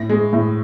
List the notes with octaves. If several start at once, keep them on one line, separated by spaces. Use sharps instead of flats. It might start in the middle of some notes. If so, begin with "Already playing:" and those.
Already playing: A2 A#6
G#3
A2